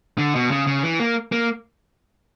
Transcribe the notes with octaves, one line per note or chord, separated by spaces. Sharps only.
D3
B2
C#3
C#3
E3
A#3
A#3